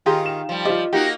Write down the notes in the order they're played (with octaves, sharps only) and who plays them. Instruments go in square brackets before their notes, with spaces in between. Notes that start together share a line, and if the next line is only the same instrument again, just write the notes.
[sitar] D#3 F4 [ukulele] D#4 G4 G#4
[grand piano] E7
[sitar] F3 G3
[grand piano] F4 D#5 [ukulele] G4 C5 D5
[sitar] A#3 D#4 F#4 [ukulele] G4